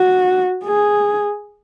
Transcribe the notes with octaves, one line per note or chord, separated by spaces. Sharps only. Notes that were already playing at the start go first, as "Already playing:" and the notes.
Already playing: F#4
G#4